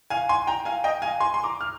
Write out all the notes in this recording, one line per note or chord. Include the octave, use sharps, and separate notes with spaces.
F5 G#5
G#5 C6
G5 A#5
F5 G#5
D#5 G5
F5 G#5
G#5 C6
C6
A#5 D6
F6